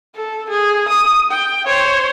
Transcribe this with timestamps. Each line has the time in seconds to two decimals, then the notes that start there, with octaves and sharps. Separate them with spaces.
0.16 A4
0.49 G#4
0.88 D#6
1.31 G5
1.66 C5 C#5